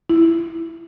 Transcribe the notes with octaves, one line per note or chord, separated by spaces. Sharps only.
E4